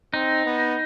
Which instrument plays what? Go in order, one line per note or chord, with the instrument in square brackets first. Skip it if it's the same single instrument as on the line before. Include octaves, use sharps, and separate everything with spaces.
[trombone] C4 [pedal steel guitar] D#4
[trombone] B3